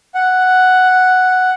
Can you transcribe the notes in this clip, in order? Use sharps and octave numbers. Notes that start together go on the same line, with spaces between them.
F#5